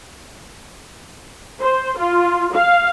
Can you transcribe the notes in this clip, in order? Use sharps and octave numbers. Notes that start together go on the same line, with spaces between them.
C5
F4
F5